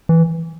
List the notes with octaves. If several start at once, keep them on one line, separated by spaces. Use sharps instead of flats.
E3